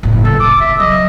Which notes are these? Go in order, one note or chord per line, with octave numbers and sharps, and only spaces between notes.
F#1 A2
C#2 A4
D#3 D6
E5
F#3 D#5